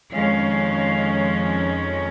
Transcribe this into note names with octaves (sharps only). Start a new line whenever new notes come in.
F2 D#3 G#3 C#4 F5